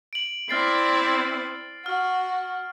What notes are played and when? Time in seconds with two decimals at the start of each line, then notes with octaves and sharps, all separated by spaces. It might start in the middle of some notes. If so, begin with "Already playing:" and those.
0.13 D7 F#7
0.49 C4 E4 D5 F6 A6 C7
1.86 F#4 F6